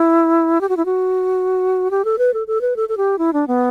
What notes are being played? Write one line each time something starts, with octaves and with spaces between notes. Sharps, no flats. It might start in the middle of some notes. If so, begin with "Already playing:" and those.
Already playing: E4
G4
F#4
E4
F#4
G4
A4
B4
A4
A4
B4
A4
A4
G4
E4
D4
B3